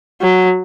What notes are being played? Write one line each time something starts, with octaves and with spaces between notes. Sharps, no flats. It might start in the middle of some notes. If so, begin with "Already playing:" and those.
F#3